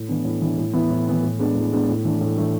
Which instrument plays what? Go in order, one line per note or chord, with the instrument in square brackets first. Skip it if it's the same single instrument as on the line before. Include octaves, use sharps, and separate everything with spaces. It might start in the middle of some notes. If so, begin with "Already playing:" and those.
Already playing: [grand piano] A2
E3 B3 D4
A2
E3 B3 D4
A2
E3 B3 E4
A2
E3 B3 E4
A2
G#3 B3 D4
A2
G#3 B3 D4
A2
E3 A3 D4
A2
E3 A3 D4